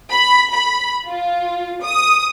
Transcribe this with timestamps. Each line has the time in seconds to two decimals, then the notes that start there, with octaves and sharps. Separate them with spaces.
0.11 B5
0.52 B5
1.06 F4
1.84 D#6